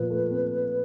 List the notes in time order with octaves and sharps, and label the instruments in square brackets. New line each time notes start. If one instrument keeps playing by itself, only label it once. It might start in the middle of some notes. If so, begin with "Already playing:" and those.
Already playing: [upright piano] A#2 F3 [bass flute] B4
[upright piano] A3
C4